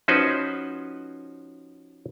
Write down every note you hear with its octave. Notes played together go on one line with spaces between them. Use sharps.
F3 C#4 D#4 F#4 B4 C5